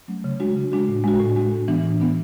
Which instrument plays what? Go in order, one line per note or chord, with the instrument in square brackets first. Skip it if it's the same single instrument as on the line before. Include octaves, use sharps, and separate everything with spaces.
[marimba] F#3 A3 C#4
C#3
G#3 D4 F#4
C#3
G#3 D4 F#4
A2
G#3 D4 F#4
A2
G#3 D4 F#4
A2
E3 B3 D4
A2
E3 B3 D4